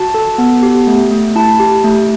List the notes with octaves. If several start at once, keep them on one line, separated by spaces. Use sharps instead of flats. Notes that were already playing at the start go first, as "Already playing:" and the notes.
Already playing: F#4 A5
A4
B3
G4
A3
A3
E4 A5
G4
A3